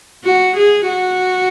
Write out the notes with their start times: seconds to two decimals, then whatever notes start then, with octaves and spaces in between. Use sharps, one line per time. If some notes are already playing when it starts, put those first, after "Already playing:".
0.24 F#4
0.57 G#4
0.88 F#4